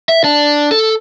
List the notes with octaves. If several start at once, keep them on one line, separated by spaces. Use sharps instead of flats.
E5
D4
A4